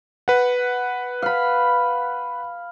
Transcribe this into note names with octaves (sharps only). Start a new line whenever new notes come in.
B4 F#5
F5 B5